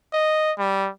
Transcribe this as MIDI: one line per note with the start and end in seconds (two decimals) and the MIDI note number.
0.13 0.52 75
0.59 0.89 55